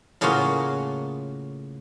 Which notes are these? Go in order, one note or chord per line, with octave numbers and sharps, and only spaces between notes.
A2 C#3 A#3 C#4 F4 F#4